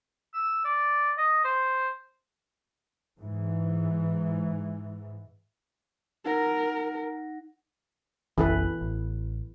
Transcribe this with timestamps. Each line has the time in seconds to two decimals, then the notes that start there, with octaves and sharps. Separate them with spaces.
0.33 E6
0.65 D5
1.18 D#5
1.44 C5
3.18 G#2 E3
6.26 D#4 A#4 F#5 A#6
8.38 F#1 B1 E3 C#4 A4 B4
8.81 A1